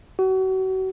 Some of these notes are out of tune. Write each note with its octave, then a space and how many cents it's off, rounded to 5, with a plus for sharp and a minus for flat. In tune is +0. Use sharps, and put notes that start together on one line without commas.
F#4 +35